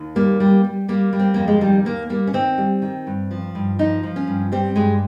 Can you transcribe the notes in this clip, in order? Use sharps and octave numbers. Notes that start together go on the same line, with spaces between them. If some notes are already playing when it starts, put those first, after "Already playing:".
Already playing: D#2
G3 A#3
G3
G3
G3 A#3
G3
C4
F2 A#3
G#3
D#3 G3
D#2 A#3
G3 A#3
C#4
D#3 C4
G3
D#3
G2
F3
G2
F3 D#4
F3
C#4
G2
G3 C4
G2 G#3